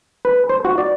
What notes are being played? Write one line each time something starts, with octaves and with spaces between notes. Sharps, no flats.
B4
C5
F#4
D5